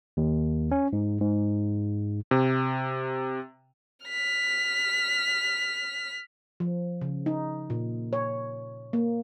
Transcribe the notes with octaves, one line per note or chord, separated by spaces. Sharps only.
D#2
C#4
G#2
G#2
C3
F6 B6
F3
C#3
D#4
A#2
C#5
A#3